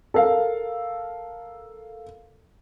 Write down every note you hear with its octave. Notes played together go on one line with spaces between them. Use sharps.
A4 A#4 F5